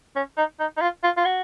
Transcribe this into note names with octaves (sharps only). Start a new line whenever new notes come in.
C#4
D#4
D#4
D#4
F4
F4
F4
F#4